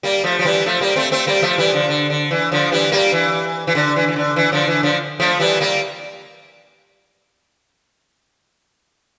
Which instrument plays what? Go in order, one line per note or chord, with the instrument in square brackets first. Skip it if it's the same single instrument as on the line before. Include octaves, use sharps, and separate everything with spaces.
[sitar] G3 A#3
F3 A3
F3
E3 G3
F3 A3
G3 A#3
A3 C4
A3 C4
G3 A#3
F3 A3
E3 G3
D3 F3
D3
D3
E3
D3 F3
E3 G3
G3 A#3
E3
E3
D3
E3
E3
D3
E3
D3 F3
E3
D3 F3
F3 A3
E3 G3
G3 A#3